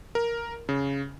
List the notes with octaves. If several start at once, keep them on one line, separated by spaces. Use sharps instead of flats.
A#4
C#3